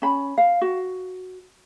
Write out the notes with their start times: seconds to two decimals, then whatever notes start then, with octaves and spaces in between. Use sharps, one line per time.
0.02 C#4 B5
0.38 F5
0.61 F#4